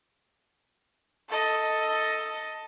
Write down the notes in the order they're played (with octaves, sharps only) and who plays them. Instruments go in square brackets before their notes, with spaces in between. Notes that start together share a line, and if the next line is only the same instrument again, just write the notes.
[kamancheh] A4 D#5